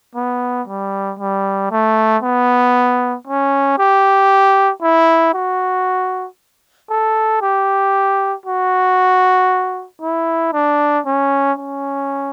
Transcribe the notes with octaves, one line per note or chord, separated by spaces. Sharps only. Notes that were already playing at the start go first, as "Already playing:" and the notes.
B3
G3
G3
A3
B3
C#4
G4
E4
F#4
A4
G4
F#4
E4
D4
C#4
C#4